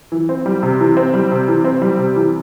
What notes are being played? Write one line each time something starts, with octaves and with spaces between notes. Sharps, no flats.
E3
C4
G3
C3
E3
C4
G3
C3
E3
C4
G3
C3
E3